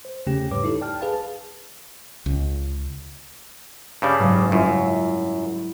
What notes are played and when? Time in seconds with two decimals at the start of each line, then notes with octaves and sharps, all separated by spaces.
0.05 C5
0.27 E2 C#3 A3 C#4 G4 G5
0.51 G#2 G3 B4 C#5 D6
0.64 D#4 E4 G4 A4
0.81 D5 G5 A5 F6
1.01 G#4 B4 F5 A5
2.26 C#2
4.02 G2 C#3 G3
4.17 F#1 G#2 C#6
4.52 F#2 G3 E4 F4